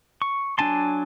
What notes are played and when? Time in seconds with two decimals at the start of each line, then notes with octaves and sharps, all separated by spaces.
0.22 C#6
0.58 F#3 D4 G#5 A5 C6